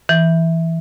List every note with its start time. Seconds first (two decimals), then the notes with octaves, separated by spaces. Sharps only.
0.09 E3